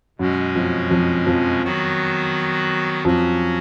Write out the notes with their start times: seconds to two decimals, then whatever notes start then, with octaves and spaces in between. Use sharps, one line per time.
0.19 F#2 B2 F#3 G#3 C#4
0.55 F2 F3
0.91 F2 F3
1.26 F2 F3
1.62 D#3 F#3 B3 F#4
3.05 F2 F3 F#3 C#4 F#4